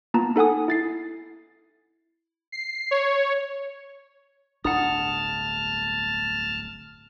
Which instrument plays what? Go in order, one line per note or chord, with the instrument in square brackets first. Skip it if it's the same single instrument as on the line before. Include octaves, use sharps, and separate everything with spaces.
[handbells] A#3 B3 F4 A5 A#5
D#4 A4 F#5 G#5 D#6
E4 A6 C7
[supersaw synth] C7
C#5
[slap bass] D1 G1 D4 [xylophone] F#5 D#6 [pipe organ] A5 F6